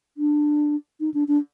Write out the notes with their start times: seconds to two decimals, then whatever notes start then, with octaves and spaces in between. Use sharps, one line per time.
0.17 D4
1.00 D#4
1.14 D4
1.28 D4